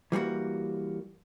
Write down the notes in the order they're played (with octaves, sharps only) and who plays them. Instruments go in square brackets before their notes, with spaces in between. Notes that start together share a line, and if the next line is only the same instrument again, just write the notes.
[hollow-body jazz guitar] E3 G3 A#3 F#4